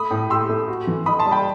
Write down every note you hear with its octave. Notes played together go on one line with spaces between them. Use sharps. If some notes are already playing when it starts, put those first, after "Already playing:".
Already playing: A3 B5 D#6
A2
G4 C6 E6
A3
F#4
E3
D#4 B5 D#6
A5 C6
G3
G5 B5